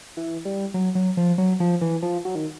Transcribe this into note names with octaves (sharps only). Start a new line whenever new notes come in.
E3
G3
F#3
F#3
F3
F#3
F3
E3
F3
F#3
D#3